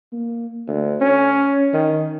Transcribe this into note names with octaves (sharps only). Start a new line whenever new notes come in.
A#3
D2
C#4
D#3